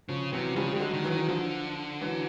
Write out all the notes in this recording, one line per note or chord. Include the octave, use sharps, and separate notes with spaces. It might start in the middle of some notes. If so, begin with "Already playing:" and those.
C#3 F3
C3 E3 F#3
C#3 F3 G3
D3 G3
F#3 G#3
D#3
E3 F#3
D#3
E3
D3 F3
E3 F#3